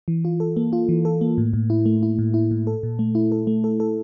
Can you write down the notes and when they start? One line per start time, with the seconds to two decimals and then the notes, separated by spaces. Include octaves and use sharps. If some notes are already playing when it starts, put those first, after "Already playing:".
0.08 E3
0.25 F4
0.40 A4
0.57 A#3
0.73 F4
0.89 E3
1.05 A4
1.21 A#3
1.38 A2
1.53 A2
1.70 E4
1.86 A3
2.03 E4
2.19 A2
2.34 E4
2.51 A2
2.67 A4
2.83 A#2
2.99 A3
3.15 E4
3.32 A4
3.47 A3
3.64 A4
3.80 A4